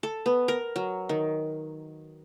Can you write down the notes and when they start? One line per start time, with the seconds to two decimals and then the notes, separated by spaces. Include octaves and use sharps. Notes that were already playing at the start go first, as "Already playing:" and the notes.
0.03 A4
0.26 B3
0.48 A#4
0.76 F#3
1.09 D#3